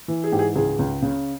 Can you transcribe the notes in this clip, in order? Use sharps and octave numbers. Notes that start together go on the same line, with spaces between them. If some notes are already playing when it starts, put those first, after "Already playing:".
E3
G#4
G#2 G4
G#4
C#2 G#4
C#2
C#3